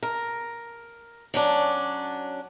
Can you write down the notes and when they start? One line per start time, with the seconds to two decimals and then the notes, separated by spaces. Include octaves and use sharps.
0.03 A#4
1.34 F#3 C#4 D4